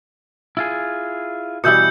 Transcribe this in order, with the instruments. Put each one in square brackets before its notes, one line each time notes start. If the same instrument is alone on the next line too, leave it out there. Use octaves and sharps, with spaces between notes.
[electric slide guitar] E4 F4 G#4
[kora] B2 E3 G3 [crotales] E6 G6 C#7